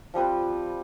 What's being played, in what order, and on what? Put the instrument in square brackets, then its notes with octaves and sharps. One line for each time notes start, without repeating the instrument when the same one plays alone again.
[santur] F3 G3 C4 B4